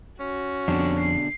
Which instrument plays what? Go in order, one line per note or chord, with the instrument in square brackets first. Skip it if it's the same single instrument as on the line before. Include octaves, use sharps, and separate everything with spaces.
[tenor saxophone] C#4 [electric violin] F#4
[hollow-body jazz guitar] F2 [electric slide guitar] B2 D3 D4
[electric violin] C7